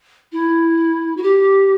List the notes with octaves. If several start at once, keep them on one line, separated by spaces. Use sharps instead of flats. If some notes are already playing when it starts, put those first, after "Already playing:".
E4
F#4
G4